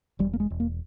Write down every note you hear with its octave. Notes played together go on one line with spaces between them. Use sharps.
E1 G3
A#3
G#3
E1
A#3